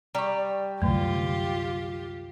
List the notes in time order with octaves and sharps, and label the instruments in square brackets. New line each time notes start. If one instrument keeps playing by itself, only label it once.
[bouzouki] G3 [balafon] A#5 C#6
[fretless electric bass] C2 F#2 [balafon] D3 A3 [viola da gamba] F4 G4